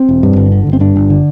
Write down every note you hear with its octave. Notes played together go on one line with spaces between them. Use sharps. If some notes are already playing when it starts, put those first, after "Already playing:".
Already playing: C4
E1
G2
G1
D3
G1
C4
G2 D4
G1
D3